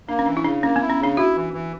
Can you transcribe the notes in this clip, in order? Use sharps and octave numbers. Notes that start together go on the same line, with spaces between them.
A#3 D4
C#4
E3 D4
E4
C#3 D4
A#3 C#4
B3
E4
C#4
C#3 D4
E4 F#4
E3
E3